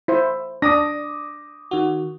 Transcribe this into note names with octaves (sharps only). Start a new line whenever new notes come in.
E4 C5
D4 D6 D#6 A#6
D#3 F#4